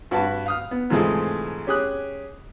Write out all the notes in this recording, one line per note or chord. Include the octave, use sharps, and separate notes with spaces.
G2 F#4 B4 A5
F5 D#6 F6
B3
G#2 C3 E3 F3 G#3 A3
C#4 G4 G#4 D#6 F#6